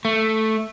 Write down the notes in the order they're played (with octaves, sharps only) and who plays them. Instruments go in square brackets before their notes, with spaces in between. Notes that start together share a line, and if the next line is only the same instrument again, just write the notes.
[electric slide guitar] A3